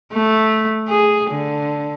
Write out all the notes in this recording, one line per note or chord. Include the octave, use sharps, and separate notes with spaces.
A3
G#4
D3